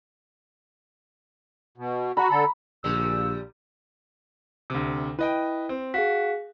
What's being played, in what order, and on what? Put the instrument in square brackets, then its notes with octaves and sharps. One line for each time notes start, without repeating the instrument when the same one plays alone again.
[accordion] B2
[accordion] F#4 [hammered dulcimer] A#5 B5
[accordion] D3 A4
[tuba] A#1 [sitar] A#2 D3 G3 [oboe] E6
[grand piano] D2 C3
[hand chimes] E4 [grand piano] B4 D#5 G5
[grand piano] C4
[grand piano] F#4 [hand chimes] G#4 F5 B6